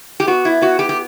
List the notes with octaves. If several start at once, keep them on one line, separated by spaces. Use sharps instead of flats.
G4
B3 F#4
E4
B3 F#4
G4
G4